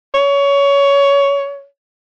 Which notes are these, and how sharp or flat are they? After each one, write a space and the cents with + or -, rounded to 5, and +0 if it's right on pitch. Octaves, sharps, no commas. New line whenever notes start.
C#5 +20